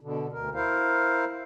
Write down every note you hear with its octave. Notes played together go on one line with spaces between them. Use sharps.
B2 D3
D2 A#4
E4 A#4 C5 F5